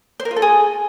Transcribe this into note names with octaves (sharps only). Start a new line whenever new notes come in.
C5
A#4
F4
A4
G#4